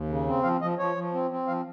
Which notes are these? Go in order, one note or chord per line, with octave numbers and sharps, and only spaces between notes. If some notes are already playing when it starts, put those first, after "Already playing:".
Already playing: D#2
C#3
C4
F3 F5
F3 D#5
F3 C#5
F3
C4
C4
F3 F5